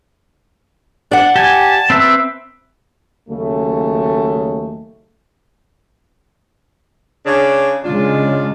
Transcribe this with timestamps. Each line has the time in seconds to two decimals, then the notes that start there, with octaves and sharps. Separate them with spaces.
1.11 D4 D5 F#5
1.36 G4 G#5 A5
1.90 C4 B4 E5
3.29 D#2 C#3 F#3 A3
7.26 C#3 D4
7.84 C#3 G#3 D4 F4